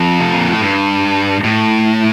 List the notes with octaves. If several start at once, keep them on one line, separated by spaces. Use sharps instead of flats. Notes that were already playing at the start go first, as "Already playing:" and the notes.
Already playing: F2
C3
A#2
A2
G2
A2